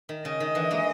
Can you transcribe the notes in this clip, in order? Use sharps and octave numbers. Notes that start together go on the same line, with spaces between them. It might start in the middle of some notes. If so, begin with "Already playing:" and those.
D#3
C#3 D#5
D#3
D3 E3
G#3 A#3